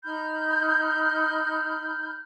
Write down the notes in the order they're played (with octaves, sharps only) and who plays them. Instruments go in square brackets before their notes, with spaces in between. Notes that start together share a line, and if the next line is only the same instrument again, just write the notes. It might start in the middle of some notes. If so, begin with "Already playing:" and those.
[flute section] D#4 B5 F6 G6